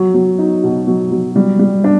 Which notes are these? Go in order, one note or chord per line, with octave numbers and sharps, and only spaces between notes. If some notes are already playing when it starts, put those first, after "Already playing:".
Already playing: F#3
F#3
D#4
B2
F#3
F#3
G3
G3
D4